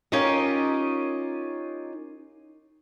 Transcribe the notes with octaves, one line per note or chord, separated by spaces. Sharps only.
C#4 D#4 F4 G4 A#4 D#5